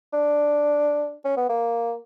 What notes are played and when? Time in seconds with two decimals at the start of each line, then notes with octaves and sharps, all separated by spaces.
0.13 D4
1.25 C#4
1.37 B3
1.49 A#3